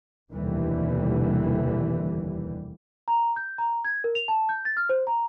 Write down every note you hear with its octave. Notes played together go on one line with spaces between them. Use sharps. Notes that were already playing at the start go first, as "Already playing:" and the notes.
F1 D#2 B2 D3 E3 G3
A#5
G6
A#5
G#6
A#4
F7
A5
G6
A6
F6
C5
A#5